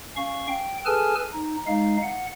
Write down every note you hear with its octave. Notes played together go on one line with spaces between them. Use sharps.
C#4 F5 C#6
G5
G#4 A4 B4 G#5 A5 F6
D#4
G#3 D#4 F5
F#5